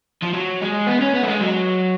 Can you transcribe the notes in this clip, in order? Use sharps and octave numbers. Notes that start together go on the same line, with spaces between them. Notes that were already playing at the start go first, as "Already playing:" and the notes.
F3
F#3
G#3
B3
C#4
B3
A3
G#3
F#3